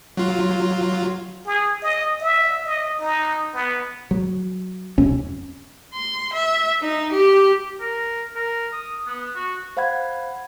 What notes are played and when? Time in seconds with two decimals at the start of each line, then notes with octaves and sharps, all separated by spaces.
0.17 F#3 F4
1.46 G#4
1.82 D#5
2.21 E5
2.65 D#5
3.00 D#4
3.54 B3
4.11 F#3
4.98 E1 F2 C3 C#4
5.94 C6
6.33 E5
6.82 D#4
7.12 G4
7.81 A#4
8.36 A#4
8.73 D#6
9.07 B3
9.36 F#4
9.77 C5 F5 F#5 B5 G#6